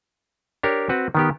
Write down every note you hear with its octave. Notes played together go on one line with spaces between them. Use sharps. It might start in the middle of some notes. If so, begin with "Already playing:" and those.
D4 G4 A#4 C#5
C4 F#4 B4
D#3 B3 G4